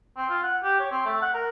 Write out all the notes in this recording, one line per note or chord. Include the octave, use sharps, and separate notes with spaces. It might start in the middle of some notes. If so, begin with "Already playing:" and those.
C4
F4
F#5
G4
C#5
C4
A3
F#5
A#4